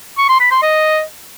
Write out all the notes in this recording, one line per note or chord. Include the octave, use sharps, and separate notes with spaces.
C#6
C6
B5
C6
D#5